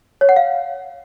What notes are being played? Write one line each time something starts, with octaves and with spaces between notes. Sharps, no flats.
C#5
F#5
F5